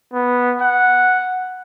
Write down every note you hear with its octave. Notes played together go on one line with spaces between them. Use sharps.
B3
F#5